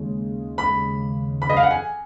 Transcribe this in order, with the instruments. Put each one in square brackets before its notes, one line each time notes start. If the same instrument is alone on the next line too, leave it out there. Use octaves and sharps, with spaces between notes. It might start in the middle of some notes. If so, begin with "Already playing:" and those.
Already playing: [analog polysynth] D#2 C#3 G#3
[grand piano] B5
B5
D#5
F5
F#5
G#5